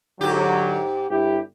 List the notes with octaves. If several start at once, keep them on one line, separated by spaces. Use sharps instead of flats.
G#2 D3 F#3 G4
G1 E4 G4